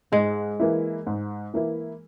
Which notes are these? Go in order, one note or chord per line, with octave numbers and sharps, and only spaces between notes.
G#2 G#3
E3 A#3 E4
G#2
E3 A#3 E4